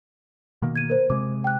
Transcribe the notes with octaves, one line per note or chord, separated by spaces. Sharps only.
B2 D#3 A#3
G#6 D#7
A#4 C5
C3 G#3 D6
G5 F#6